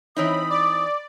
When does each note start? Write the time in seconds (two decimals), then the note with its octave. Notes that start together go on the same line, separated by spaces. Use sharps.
0.17 E3 C4 D#4 C#5 B5 D#6
0.50 D5 D6